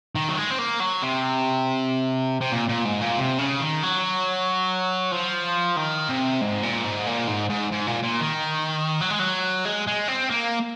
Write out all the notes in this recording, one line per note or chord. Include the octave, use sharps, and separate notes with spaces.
D#3
F#3
G#3
C4
A#3
F#3
C3
C3
A#2
A#2
G#2
A#2
C3
C#3
D#3
F#3
F3
D#3
C3
G#2
A#2
G#2
A#2
G#2
G#2
G#2
A#2
A#2
D#3
F#3
G#3
F#3
G#3
G#3
C4
A#3